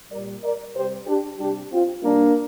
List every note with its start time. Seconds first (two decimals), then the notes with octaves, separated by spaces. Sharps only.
0.12 A#2 G3 A#4 D5
0.43 A#4 D5
0.75 C3 G3 G4 C5
1.07 D4 G4
1.39 C3 G3 D4 G4
1.71 C4 F4
2.03 C3 G3 A#3 D4